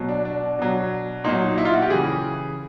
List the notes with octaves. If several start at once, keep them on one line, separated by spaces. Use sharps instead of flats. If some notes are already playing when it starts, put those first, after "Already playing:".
Already playing: B2 F#3
D4
D4
B2 F#3
A#2 F#3 D#4
E4
F4
F#4
G4
C#3 E3 G#4